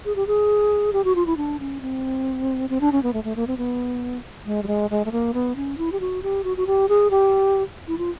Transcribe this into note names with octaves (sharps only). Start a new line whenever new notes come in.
G#4
G4
G#4
G4
F#4
F4
E4
D4
C#4
C4
C4
D4
C#4
B3
A3
A3
A#3
C4
B3
G#3
G3
G#3
G#3
A3
A#3
B3
C#4
E4
G4
F#4
G4
F#4
F#4
G4
G#4
G4
E4
F4